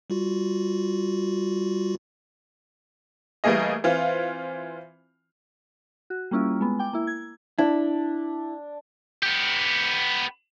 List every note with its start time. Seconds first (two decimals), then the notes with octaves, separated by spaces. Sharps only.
0.10 G3 F4 F#4
3.44 E3 G3 A3 A#3 G#4 D#5
3.84 E3 C4 F4
6.10 F#4
6.31 G3 A#3 C#4 E4 F4
6.61 G#3 B3
6.79 G5 D6
6.93 A#3 E4
7.07 G#6
7.59 D4 E4
9.23 B3 G4